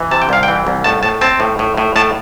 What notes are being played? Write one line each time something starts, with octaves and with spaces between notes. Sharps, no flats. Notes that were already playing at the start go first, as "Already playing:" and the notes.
Already playing: E3
C3 A5
G5
C2 F5
G5
E3
C2
A2 A5
A2 A5
C4 A5
A2
A2
A2
A2 A5